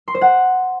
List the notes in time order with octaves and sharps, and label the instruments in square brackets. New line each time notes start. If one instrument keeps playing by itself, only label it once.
[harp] C6
C5
F#5